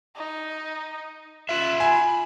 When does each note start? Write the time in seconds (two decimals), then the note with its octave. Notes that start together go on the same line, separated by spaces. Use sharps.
0.16 D#4
1.49 F4 E5 F#6
1.80 G#5 B5